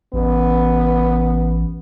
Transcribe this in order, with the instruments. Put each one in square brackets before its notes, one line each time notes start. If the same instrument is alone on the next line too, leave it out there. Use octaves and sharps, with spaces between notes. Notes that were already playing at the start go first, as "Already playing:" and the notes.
[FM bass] A1 [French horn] B3